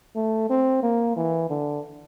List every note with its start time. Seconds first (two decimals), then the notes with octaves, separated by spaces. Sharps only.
0.15 A3
0.49 C4
0.83 A#3
1.16 E3
1.50 D3